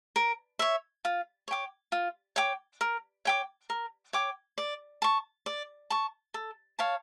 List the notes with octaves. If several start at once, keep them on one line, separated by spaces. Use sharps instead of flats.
A#4
C#5 E5
F4
C#5 G5 D6
F4
C#5 G5 D6
A#4
C#5 G5 D6
A#4
C#5 G5 D6
D5
A5 C#6
D5
A5 C#6
A4
C#5 F5 A5